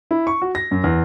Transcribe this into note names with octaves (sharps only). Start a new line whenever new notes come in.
E4
C#6
F#4
A#6
F#2
E2